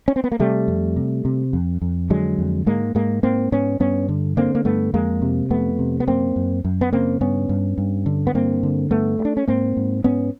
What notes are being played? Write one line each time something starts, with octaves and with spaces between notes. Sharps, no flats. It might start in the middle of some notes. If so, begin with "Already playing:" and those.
C#4
C4
B3
A#3
C3 G3 A3
F2
C3
C3
F2
F2
D3 F#3 G#3
F2
G#2 G#3 A#3
G#2 G#3 A#3
G#2 A#3 C4
G#2 B3 C#4
G2 B3 C#4
D3
D3 A#3 C4
A#3
G2 A3 B3
F2 G#3 A#3
C3
F2 A3 B3
C3
B3
F#2 A#3 C4
F#2
F#2
B3
C#3 A#3 C4
G2 B3 C#4
G2
G2
D3
B3
G2 A#3 C4
D3
G2 A3 B3
G2
D4
C#4
G#2 A#3 C4
G#2
G#2 B3 C#4